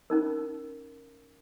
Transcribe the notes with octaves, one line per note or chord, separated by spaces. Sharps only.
C#4 D#4 A#4